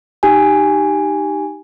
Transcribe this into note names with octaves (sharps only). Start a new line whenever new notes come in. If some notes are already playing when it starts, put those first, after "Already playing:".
D#4 G4 G#5